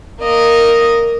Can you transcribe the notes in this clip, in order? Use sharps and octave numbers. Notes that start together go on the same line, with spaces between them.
A#3 D#5